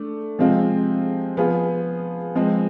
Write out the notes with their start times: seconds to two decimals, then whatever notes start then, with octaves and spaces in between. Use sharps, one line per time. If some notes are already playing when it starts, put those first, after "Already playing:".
Already playing: A3 D4
0.39 C3 F3 G#3 C4 F4
1.37 F3 B3 F4 G#4
2.35 F3 G#3 C4